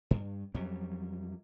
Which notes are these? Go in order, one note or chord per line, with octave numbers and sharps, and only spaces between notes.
G2
F2 F#3 G3